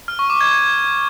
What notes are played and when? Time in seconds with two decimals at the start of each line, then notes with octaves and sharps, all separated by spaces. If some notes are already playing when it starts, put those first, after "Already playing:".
0.08 F6
0.19 C#6
0.30 D6
0.41 G#6